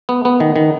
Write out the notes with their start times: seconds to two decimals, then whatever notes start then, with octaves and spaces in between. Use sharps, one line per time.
0.09 B3
0.25 B3
0.40 D#3
0.56 D#3